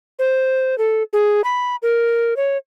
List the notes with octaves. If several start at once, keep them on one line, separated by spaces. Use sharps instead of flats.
C5
A4
G#4
B5
A#4
C#5